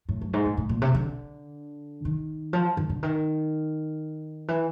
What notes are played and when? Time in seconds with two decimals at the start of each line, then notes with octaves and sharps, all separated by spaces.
0.09 A2
0.21 F#2
0.33 G#2
0.46 A#2
0.57 A2
0.69 A#2
0.82 C3
0.95 D3
2.05 D#3
2.53 F3
2.77 D#3
2.90 D3
3.03 D#3
4.48 E3